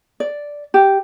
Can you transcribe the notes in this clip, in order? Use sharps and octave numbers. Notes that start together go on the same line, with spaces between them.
D5
G4